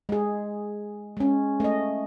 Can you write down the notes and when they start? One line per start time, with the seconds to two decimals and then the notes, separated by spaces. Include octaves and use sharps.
0.09 G#3 G#4
1.17 G#3 C#4
1.60 A3 D#5